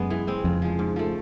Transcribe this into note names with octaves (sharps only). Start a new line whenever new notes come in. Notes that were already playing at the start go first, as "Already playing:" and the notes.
Already playing: F#2 G#3 B3
E3
G#3 C4
F2 C#3
F3 G#3
G#2
F3 A3